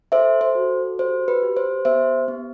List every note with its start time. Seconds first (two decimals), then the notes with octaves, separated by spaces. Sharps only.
0.12 A4 C5 E5
0.41 C5
0.55 F#4
0.98 G4 C5
1.28 B4
1.42 G4
1.57 C5
1.85 B3 C5 E5
2.28 B3